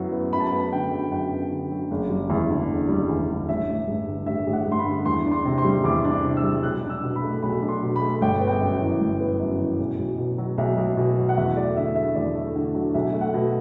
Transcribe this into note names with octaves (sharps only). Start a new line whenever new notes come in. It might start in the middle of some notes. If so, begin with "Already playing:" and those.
Already playing: F#2 F#3 B3 E4
B3
F#2 B5
A5
B3 B5
D3 G5
F#3
F#2 G5
B3
D3
F#3
F#1
G3
E2
D3
F#1
G3
E2
D3
A1 E5
A1
G2
D3
A1 E5
A1
F#5
G2
C6
B5
D3
E2 C6
D4
C6
C3
C6
G3
E2 D6
D4
D6
C3
E6
G3
B1 F#6
D4
E6
B2
B5
A3
B1 B5
D4
C6
B2
B5
A3
G1 G5
B3
G5
F#2
E3
G1
B3
F#2
E3
B1
B1
B2
F#3
B1 E5
B1
B2
F#3
F#5
E2 E5
A3 D5
D3 E5
F#3 E5
E2 D5
A3
D3
F#3
B1 E5
A3
F#5
B2